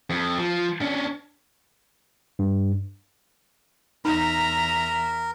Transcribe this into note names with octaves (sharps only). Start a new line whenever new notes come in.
F2
F3
C#4 D4
G2
E2 D#4 A#4 E5 A#5